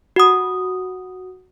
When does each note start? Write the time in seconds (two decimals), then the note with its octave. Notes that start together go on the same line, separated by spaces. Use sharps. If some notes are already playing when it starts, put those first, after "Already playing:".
0.16 F#4 F#5 D#6